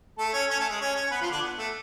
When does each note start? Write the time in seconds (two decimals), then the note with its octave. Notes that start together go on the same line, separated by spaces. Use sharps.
0.18 A3 A4
0.34 C#4 C#5
0.50 C#4 C#5
0.59 A3 A4
0.70 G#3 G#4
0.81 C#4 C#5
0.95 C#4 C#5
1.11 B3 B4
1.21 F3 F4
1.31 D3 D4
1.42 B3
1.58 A3